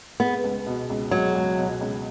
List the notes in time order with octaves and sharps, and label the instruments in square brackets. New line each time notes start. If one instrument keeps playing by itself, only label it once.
[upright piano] G#3 [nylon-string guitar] B3
[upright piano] C#2
B2
C#2
[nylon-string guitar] F#3 [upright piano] G#3
[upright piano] C#2
B2
C#2